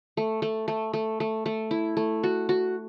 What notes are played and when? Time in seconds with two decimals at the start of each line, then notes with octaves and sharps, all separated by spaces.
0.17 A3
0.42 A3
0.68 A3
0.93 A3
1.20 A3
1.46 A3
1.71 E4
1.97 A3
2.23 F#4
2.49 F#4